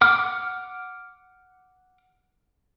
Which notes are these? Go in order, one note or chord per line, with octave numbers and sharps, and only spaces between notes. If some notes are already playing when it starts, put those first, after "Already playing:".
F#5 D6 F6